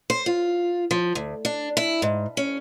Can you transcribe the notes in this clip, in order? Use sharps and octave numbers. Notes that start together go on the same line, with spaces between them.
C5
F4
F3
D2
D4
E4
G#2
C#4